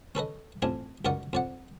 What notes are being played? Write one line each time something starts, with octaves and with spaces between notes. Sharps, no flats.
C#4 A4 B4 D#5
A1 F2 D4 G#5
C#2 F#2 D#4 A#4 D5 F#5
F2 D5 F#5